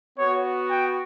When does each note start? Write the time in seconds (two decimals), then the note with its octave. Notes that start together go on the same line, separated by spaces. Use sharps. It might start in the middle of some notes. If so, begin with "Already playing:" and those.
0.16 B3 F#4 C#5
0.69 G5